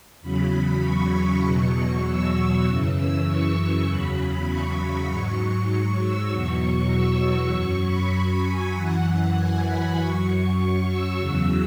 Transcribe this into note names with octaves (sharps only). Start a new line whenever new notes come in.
E2 C#3 F#3 B5
B5
C#6
E2 B2 F#3
E6
F#2 C#3 E3
E6
C#6
E2 C#3 F#3 B5
B5
C#6
G#2 F#3 C#6
C#6
E6
E2 B2 F#3 C#6
E6
C#6
F#2 F#3
B5
G#5
F#2 E3 F#5
G#5
B5
F#2 F#3 C#6
C#6
E6
E2 C#3 F#3 E6